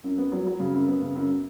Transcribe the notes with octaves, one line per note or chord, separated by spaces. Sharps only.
F#2
B3
F#3
F#3
C#3
F#2
B3
C#3
F#2